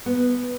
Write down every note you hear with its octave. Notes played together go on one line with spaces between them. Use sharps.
B3